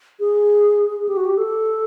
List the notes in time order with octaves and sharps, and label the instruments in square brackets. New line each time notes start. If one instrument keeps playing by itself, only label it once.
[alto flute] G#4
G4
F#4
G4
A4